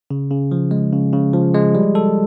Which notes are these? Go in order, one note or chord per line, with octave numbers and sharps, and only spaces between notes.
C#3
C#3
F3
G#3
C#3
C#3
F3
G#3
G3
A4